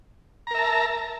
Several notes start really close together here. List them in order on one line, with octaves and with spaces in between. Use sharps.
A#5 A#4 E5 A5